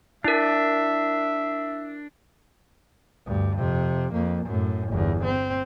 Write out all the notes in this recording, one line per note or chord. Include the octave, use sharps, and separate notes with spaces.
D4 E4 A#4 E5
D2 G2
F2 C3
F2 A#3
F#2 A2
G1 E2
C4